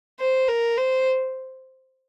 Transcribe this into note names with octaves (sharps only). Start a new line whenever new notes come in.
C5
A#4
C5